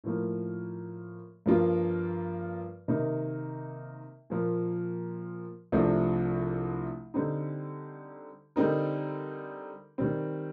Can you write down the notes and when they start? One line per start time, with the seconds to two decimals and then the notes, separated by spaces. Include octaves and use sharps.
0.04 A2 F3 A#3
1.46 G2 F3 A#3 F4
2.88 C3 D#3 A#3 D#4
4.30 A#2 F3 A#3
5.72 C2 C3 F3 A3 D4
7.14 D3 G3 C4 D#4
8.56 D3 G3 C4 D#4 A#4
9.98 D#3 G3 C4